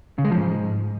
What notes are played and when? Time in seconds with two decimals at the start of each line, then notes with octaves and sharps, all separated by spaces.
0.18 C#3
0.25 G#3
0.31 F3
0.37 G#2